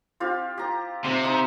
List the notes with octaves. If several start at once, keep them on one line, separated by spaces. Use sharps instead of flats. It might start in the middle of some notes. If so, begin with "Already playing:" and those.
C4 F4 G4
G4 A#5
C3 E6
D#4 C6